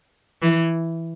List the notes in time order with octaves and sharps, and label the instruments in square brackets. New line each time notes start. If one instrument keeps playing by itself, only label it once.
[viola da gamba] E3